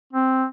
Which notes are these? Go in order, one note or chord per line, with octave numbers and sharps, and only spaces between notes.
C4